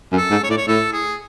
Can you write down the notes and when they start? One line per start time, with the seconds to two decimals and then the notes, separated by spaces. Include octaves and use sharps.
0.12 F#2
0.18 A4
0.30 G#2
0.44 C#5
0.49 A2 D5
0.58 C#5
0.68 A2 A4
0.93 G#4